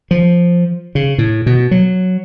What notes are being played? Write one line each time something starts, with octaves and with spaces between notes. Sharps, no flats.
F3
C#3
A2
B2
F#3